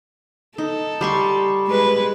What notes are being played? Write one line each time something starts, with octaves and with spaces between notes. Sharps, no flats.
D#4 A4
G3 C6 C#6
G#3 B4